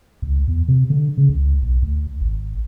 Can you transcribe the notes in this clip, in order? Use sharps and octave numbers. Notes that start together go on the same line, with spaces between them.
C#2
E2
C3
D3
C#3
C#2
B1
D2
G#1